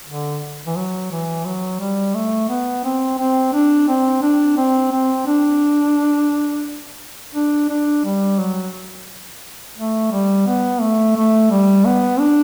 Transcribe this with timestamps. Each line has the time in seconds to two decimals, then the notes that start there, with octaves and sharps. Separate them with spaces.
0.07 D3
0.67 E3
0.76 F#3
1.11 E3
1.45 F#3
1.80 G3
2.14 A3
2.49 B3
2.84 C4
3.18 C4
3.53 D4
3.88 C4
4.23 D4
4.57 C4
4.92 C4
5.27 D4
7.35 D4
7.69 D4
8.05 G3
8.39 F#3
9.77 A3
10.12 G3
10.47 B3
10.81 A3
11.16 A3
11.51 G3
11.85 B3
12.20 D4